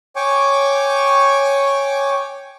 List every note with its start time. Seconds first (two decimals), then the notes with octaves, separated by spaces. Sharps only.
0.16 C#5 G5 G#5 C#6 D6